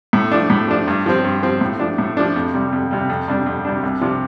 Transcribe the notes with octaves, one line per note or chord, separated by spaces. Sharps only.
A2
F3 D4
A2
F3 D4
G2
F3 C4
G2
F3 C4
A2
F3 D4
A2
F3 D4
F2
C3 G3
F2
C3 G3
F2
C3 G3 D4
F2
C3 G3 D4
C2
C3 F3 D4